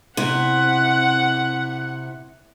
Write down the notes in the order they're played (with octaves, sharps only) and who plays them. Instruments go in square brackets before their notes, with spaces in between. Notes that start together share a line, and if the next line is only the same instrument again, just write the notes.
[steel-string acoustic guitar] C3 E4 [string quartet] F#5